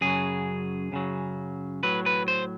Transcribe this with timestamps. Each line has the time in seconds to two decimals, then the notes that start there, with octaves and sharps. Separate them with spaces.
0.01 F#2 C#3 F#3 G#4
0.92 F#2 C#3 F#3
1.83 A2 F#3 B4
2.06 B4
2.28 C5